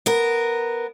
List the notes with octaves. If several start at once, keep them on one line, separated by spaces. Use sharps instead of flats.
B3 A#4